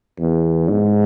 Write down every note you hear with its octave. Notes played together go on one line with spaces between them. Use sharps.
E2
G#2